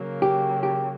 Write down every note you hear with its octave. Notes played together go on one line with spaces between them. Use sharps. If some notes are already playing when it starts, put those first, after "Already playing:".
Already playing: C#3 F#3 A#3
G4
G4